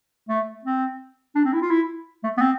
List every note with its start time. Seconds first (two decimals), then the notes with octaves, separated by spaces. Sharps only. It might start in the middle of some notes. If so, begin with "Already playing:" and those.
0.29 A3
0.64 C4
1.35 D4
1.45 C4
1.53 E4
1.62 F4
1.70 E4
2.24 A3
2.37 B3
2.41 C4